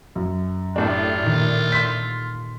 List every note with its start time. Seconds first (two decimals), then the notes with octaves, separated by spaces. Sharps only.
0.15 F#2
0.76 A2 D4 F4 G4 A4 A5
1.22 A#2 D#3
1.72 C6 E6 G6 B6